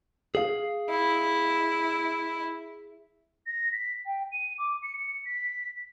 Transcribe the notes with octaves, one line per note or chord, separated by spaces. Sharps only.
G#4 F5
E4
A#6
B6
G5
D#7
D6
C#7
C#7
B6